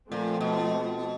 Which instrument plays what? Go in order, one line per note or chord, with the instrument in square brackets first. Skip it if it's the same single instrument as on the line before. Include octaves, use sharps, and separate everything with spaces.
[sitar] A#2 [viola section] F3 A3 C4
[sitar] B2